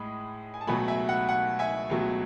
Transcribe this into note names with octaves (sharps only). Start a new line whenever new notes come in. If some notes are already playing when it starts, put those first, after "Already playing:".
Already playing: A2 G#3 B5 D#6
G#5
A5
C#2 B2 F#3 A3 G#5 B5
E5 G#5
F#5
F#5
E5 G#5
C#2 B2 F#3 A3